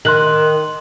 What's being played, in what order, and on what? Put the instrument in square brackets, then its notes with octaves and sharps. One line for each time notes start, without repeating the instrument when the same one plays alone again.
[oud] D#3 [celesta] C6 F#6 F#7